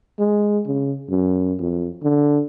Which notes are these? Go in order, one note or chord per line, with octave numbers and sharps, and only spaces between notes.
G#3
C#3
F#2
F2
D3